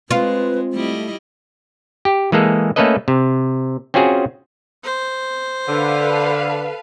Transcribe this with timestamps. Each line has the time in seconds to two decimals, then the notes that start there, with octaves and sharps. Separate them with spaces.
0.11 G#3 C4 F4 B4
0.73 G3 A3 E4 D#5
2.05 G4
2.32 E3 G#3 A#3 G#4 A4
2.76 A3 A#3 C#4 A4 B4 D#5
3.08 C3
3.94 C4 C#4 F4 F#4 G#4
4.84 C5
5.68 D3 A4 B4 F5